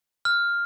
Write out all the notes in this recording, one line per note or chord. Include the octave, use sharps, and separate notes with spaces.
F6